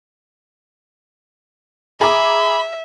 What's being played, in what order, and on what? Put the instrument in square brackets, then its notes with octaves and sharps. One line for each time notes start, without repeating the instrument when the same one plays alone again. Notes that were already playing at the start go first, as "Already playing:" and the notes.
[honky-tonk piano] G#4 A#5 D6 [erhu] E5 [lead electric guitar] B5